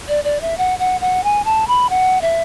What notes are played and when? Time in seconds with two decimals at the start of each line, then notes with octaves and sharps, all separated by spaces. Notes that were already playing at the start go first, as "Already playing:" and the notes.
0.08 D5
0.24 D5
0.41 E5
0.58 F#5
0.79 F#5
1.01 F#5
1.24 G#5
1.45 A5
1.68 B5
1.90 F#5
2.22 E5